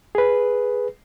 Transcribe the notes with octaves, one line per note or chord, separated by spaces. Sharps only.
G#4 B4